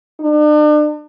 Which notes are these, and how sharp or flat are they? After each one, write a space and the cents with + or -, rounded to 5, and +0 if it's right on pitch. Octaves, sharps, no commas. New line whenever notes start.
D4 +40